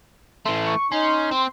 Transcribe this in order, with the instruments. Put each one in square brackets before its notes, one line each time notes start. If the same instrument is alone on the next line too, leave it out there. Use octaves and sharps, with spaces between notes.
[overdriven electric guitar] E3 A3 [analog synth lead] C6
[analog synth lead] C#6
[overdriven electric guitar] C#4 [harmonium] D#4 [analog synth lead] C6
[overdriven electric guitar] C4